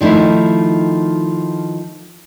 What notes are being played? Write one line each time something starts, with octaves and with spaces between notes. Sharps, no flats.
D#3 F3 A3 D#4 E4